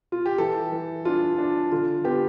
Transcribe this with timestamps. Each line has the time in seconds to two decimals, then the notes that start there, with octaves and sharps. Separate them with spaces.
0.12 F4
0.26 G4
0.38 E3 A4
0.72 E3
1.05 D4 F4
1.38 D4
1.72 D3 F4
2.04 B3 G4